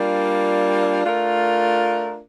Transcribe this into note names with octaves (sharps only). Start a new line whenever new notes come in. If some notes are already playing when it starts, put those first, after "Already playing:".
Already playing: G3 A#3 D4 F4
A3 D4 F4 A#4